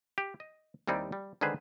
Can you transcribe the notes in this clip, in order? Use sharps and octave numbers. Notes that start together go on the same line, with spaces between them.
G4
D#5
D#2 G3 C4 D#4 E4 D5
G3
D3 D#3 G#3 G#4 B4 C5